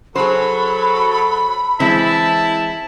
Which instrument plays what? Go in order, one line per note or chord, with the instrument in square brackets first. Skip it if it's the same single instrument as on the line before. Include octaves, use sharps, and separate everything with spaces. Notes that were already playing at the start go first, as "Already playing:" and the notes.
[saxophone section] F#3 [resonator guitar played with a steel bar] G#4 C5 [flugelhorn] A4 [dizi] B5
[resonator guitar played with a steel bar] E3 G#3 C4 [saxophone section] E4 [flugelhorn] A5